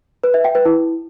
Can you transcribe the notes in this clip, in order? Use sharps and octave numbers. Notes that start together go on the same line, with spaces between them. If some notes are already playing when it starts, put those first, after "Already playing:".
B4
E5
G5
B4
E4